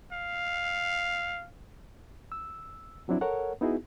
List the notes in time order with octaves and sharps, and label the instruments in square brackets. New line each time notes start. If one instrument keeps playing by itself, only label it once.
[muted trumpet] F5
[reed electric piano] E6
F3 F#3 C4 D4 E4
A4 A#4 C#5 F#5
B3 D#4 E4 F#4 G#4